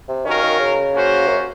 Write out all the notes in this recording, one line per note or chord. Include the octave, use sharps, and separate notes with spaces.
C3
D#3 C#4 F#4 A#4 F5
D#3
C#3
A#3 C#4 F#4 C5
F#2